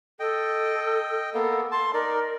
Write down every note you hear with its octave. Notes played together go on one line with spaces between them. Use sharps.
A4 D#5 G5
A#3 B3 A4
A5 C6
D#4 A#4 D5